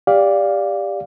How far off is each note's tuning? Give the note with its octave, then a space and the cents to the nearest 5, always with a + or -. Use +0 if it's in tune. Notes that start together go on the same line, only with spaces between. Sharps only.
G4 +20 D5 -10 F5 +5